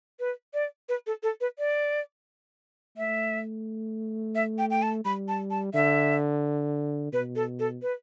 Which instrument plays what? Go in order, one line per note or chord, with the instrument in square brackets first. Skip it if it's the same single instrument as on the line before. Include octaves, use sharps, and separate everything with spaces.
[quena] B4
D5
B4
A4
A4
B4
D5
[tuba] A3 [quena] E5
[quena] E5
G5
G5
A5
[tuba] G3 [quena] B5
[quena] A5
A5
[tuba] D3 [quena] E5
[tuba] B2 [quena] B4
[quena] A4
A4
B4